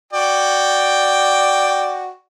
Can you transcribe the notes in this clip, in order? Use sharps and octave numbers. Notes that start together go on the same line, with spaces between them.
F#4 D5 G5